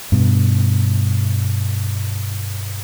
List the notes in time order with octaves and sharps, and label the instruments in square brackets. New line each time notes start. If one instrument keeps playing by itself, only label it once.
[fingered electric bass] G2 B2